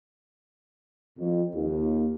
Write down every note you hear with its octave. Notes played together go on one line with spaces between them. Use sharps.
F2
D#2